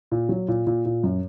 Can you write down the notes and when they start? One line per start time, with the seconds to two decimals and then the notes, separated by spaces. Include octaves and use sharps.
0.11 A#2
0.29 F#3
0.48 A#2
0.67 A#2
0.85 A#2
1.03 F#2